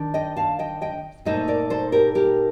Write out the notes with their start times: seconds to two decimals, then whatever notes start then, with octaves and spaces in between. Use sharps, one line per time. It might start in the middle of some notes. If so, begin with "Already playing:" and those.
Already playing: D#3 D4
0.14 D#5 G5
0.36 F5 A5
0.59 D#5 G5
0.81 D#5 G5
1.25 A#2 A3 D#4 C5 D#5
1.48 A#4 D5
1.70 A4 C5
1.92 G4 A#4
2.15 G4 A#4